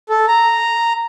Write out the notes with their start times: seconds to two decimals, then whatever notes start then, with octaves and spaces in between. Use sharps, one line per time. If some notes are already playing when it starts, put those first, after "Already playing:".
0.09 A4
0.28 A#5